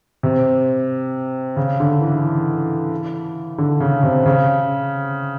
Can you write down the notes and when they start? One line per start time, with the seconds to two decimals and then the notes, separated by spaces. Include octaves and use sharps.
0.23 C3
1.57 C#3
1.80 D3
2.01 E3
3.58 D3
3.80 C#3
4.03 C3
4.26 C#3